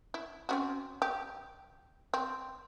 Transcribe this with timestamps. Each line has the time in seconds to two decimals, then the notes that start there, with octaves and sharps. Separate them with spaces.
0.14 E4
0.49 C4 C#4 F#4
1.02 G4
2.14 C4